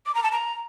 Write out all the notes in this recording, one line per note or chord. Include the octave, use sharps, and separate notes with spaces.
D6
A#5
A5
A#5